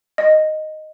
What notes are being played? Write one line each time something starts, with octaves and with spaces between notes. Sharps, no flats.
D#5